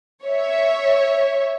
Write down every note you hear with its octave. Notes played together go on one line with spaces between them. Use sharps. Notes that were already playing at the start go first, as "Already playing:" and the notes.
C#5 E5